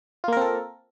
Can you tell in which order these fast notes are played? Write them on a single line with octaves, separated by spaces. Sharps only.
F4 A#3 A#4 C4 A4